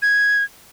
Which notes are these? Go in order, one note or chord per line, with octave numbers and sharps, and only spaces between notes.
G#6